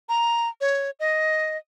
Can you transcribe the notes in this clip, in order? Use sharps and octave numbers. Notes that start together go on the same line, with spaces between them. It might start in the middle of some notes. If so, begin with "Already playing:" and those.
A#5
C#5
D#5